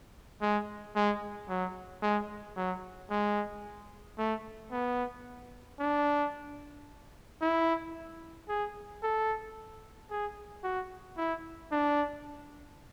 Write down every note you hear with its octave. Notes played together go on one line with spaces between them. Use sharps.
G#3
G#3
F#3
G#3
F#3
G#3
A3
B3
D4
E4
G#4
A4
G#4
F#4
E4
D4